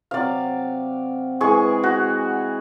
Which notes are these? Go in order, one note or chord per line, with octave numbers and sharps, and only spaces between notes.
C3 F#3 D5 F5
E3 G#3 G#4 C#6
F#4